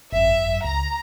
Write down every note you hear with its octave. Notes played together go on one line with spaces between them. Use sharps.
G#1 F#2 E5
C#2 A#5